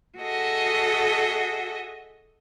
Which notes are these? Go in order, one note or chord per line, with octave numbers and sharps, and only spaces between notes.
F#4 G#4 A4 D#5 E5